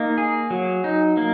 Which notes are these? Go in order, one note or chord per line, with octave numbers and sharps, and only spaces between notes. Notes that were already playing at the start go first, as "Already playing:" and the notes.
Already playing: A#3 D#4
G#4
F#3
D#4
A#3